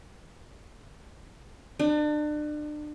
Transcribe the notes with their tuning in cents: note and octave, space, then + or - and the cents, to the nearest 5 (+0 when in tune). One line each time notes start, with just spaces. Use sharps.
D4 +35